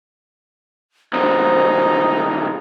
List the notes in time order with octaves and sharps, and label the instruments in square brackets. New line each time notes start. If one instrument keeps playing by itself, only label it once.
[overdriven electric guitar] C2 F#2 [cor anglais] D#4 [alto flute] C5